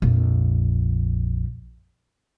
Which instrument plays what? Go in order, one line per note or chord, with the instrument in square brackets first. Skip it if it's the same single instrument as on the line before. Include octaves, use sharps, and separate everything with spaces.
[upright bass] A#1 F2